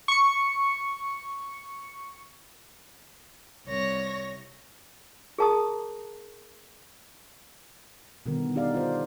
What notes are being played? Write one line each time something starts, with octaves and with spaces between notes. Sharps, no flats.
C#6 C#7
C2 C#5 A#6
G#4 A#4 A5 A#5 D#6
B2 D3 D#3 G3 B3 A#4
D4 D#4 G4 D5 F5
F4 C5